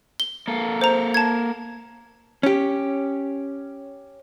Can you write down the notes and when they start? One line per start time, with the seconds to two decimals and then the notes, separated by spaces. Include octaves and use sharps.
0.20 G7
0.48 A#3 A4
0.81 C5 A#5
1.14 A5 G#6
2.43 C#4 G4